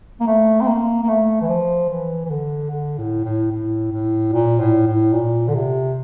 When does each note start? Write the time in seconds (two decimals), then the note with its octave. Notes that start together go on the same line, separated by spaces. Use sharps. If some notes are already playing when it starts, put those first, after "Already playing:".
0.20 A#3
0.27 A3
0.61 C4
0.68 A#3
1.03 A#3
1.08 A3
1.42 E3
1.48 F3
1.89 E3
2.25 E3
2.30 D3
2.70 D3
2.98 A2
3.25 A2
3.52 A2
3.92 A2
4.33 A#2
4.60 A2
4.87 A2
5.13 A#2
5.48 D3
5.55 C3